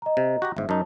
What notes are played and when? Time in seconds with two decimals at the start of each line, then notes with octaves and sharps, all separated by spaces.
0.02 D#5 A#5
0.17 C3
0.42 F#4 G4 A#5
0.57 G1 G#2 E5
0.69 F#2 D#4 A5